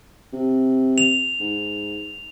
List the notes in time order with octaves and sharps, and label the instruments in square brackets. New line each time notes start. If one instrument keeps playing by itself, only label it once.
[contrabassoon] C3
[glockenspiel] F7
[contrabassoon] G#2